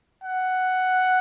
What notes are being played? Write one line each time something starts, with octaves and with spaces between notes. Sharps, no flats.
F#5